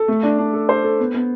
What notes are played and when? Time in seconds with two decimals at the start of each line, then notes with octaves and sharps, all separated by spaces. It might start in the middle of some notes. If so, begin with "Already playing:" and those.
Already playing: A4
0.08 A3
0.23 D4
0.39 D4
0.53 A4
0.69 C5
0.84 A4
0.99 B3
1.14 B3